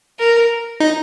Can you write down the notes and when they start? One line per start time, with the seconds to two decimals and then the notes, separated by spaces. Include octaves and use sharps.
0.19 A#4
0.80 D#4